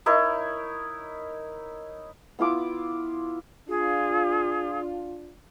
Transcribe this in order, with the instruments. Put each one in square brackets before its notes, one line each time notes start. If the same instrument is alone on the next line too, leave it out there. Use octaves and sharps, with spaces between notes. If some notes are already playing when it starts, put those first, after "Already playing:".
[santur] D#4 E4 A#4 C#5
B3 E4 F4 D6
[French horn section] D4 F4 [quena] G#4